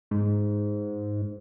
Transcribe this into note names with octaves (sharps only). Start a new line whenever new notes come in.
G#2